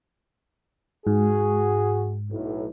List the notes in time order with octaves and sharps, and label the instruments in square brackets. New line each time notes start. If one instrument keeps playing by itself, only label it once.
[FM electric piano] G#2 [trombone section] F#4 G#4
[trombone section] B1 A2